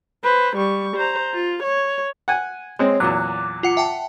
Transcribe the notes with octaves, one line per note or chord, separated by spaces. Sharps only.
B4 C5
G3 C#6
C5 A#5
F4
C#5
F#5 G#5
G#3 C4 C#5
E2 A#2 F#3 D6 F#6
F4 F#5 C#7
E5 G5 A5